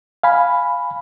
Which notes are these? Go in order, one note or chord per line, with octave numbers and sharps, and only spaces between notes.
F5 G#5 B5